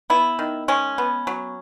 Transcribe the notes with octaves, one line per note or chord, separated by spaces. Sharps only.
B3 E4
D#3
G#3 C#4
B3
F#3